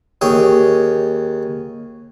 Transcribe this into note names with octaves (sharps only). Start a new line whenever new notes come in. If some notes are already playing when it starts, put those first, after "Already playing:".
D#2 G#4 C#5 G5